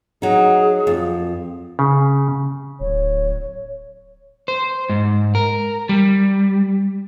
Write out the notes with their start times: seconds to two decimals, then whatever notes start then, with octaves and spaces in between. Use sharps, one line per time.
0.22 F#3 D#4 G#4
0.87 F2
1.79 C#3
2.80 D1 C#5
4.48 C5
4.89 G#2
5.35 A#4
5.89 G3